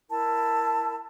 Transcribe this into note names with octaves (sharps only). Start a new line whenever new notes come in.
E4 A#4 A5